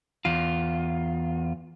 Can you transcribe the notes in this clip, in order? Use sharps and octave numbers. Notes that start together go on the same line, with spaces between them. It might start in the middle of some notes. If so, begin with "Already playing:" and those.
E2 F4